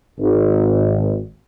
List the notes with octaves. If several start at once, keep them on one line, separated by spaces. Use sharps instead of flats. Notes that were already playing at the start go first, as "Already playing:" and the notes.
G#1